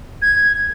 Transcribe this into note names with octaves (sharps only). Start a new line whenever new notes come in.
G#6